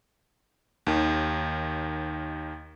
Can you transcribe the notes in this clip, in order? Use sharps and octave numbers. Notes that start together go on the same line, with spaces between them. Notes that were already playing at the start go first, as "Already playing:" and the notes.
D#2 D#3